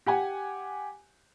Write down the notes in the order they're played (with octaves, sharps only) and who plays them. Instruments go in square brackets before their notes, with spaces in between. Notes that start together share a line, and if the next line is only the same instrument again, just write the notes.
[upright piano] G4 F#5 G#5